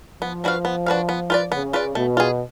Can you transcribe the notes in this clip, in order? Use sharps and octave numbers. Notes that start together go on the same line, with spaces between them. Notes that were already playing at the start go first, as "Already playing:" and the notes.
F3 B3
D4 F#4 B4 F5
B3
D4 F#4 B4 F5
B3
F4 B4 D5
C#3 B3
F4 B4 D5
B2 A3
F4 G#4